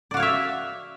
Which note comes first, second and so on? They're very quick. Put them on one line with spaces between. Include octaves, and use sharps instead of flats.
D5 F#4 F5 C#5 E5